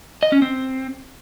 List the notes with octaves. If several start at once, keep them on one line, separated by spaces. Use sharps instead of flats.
D#5
C#4
C4